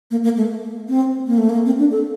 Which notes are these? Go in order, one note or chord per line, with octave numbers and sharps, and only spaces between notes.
A#3
A#3
A3
C4
A#3
A3
A#3
C4
D4
A4